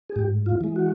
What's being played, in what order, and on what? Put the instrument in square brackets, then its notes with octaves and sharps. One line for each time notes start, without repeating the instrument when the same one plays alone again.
[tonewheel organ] G#4
G#2 G4
F4
E3 G#3
F#4